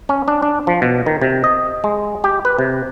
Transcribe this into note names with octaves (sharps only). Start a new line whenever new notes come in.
C#4
D4
D4
F3
B2
D#3
C3
D#5
G#3
G4
B4
C3